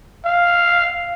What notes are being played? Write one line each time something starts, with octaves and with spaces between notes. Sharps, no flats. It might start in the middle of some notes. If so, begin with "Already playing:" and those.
F5